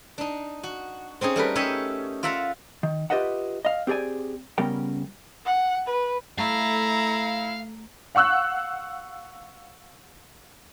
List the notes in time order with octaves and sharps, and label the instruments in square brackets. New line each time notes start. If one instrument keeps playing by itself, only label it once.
[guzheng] D4 D#4
F#4
C4 C#4 D#4 G#4
G3 A3 A#4 B4
C#4 D#4 G4 C#5 D#5 E5
F4 D5 E5 F#5 A#5
[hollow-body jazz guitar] D#3
F4 G4 B4 D#5 E5 F#5
D#5 F5
C4 G4 G#4 D5 G#5
C#3 G3 B3 C#4 A#4 G5
[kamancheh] F#5
B4
[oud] A3 [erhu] E4 [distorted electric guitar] F5 [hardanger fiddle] A#5
[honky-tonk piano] F5 F#5 C#6 E6 F#6